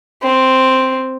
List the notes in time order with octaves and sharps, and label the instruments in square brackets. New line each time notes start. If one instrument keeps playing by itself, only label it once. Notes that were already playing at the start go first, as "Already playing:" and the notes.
[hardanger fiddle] C4